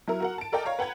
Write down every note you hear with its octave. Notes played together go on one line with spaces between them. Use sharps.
F#3 E4 A#4
F#4 A#4 F#5
A5 D7
A4 A#4 D5 D#5 G5 A5
C#5 F5 A#5
B4 F#5 G5 A#5 G#6